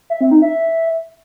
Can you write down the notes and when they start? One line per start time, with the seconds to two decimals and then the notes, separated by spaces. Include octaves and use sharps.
0.10 E5
0.21 C4
0.31 D#4
0.42 E5